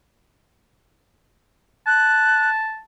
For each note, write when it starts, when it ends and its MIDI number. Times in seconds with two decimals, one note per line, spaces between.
1.87 2.81 81
1.87 2.50 90